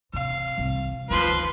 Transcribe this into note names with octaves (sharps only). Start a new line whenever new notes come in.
C3 F5
C2
D2 D#3 F3 B4 C6